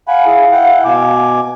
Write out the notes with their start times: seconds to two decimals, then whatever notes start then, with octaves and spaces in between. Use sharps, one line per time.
0.08 F5 F#5 G#5 B5
0.26 E4 G#4
0.52 E4 F#5 G5
0.85 B2 G#5 D6